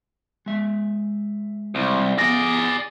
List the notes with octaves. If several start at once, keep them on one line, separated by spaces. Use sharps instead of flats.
G#3 E5
C2
B3 G#4 D5 A#6